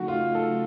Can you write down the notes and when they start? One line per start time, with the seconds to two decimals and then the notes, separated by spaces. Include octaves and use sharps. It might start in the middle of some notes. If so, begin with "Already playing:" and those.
Already playing: C#3 F#3 A3 D#4 F#4
0.08 F4
0.35 A4